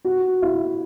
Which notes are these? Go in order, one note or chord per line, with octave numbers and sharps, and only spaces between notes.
F#4
E4